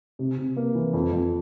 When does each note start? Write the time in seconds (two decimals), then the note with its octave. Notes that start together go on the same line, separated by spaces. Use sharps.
0.19 C3
0.38 C3
0.57 A#3
0.75 E3
0.94 F2
1.13 F2